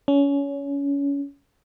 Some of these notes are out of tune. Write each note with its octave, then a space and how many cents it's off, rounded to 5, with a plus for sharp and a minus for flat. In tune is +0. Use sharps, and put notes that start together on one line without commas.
C#4 +25